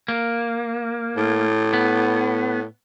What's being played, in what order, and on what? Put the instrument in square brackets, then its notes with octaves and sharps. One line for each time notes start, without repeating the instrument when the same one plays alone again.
[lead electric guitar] A#3
[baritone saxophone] A2
[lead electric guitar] B3